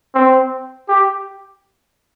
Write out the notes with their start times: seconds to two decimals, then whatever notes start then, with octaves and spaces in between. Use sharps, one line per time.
0.15 C4
0.88 G4